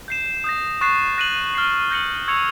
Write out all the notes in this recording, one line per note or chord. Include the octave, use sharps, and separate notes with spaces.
G6 C7 E7
D#6 G6 A#6
C#6 F#6 A6 C7 E7
F#6 A#6 D#7 F#7
F6 A6 C7 E7
G6 A#6 C#7 F#7
C#6 E6 G#6 C#7 F7